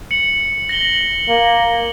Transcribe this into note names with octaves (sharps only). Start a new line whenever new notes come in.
C#7 F#7
A#6 F#7 G7
A#3